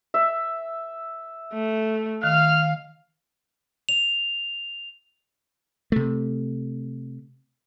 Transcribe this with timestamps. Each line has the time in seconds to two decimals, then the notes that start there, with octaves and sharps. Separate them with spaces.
0.14 E5
1.53 A3
2.24 D#3 F5 F6
3.89 F7
5.92 C3 A3